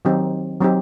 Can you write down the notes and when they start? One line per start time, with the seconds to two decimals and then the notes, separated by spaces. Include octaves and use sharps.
0.05 D#3 F#3 C4 D#4 G4
0.61 F#3 C4 D#4 G4